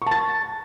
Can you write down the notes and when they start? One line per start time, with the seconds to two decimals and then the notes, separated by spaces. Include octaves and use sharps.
0.02 C#6
0.06 A5
0.11 A6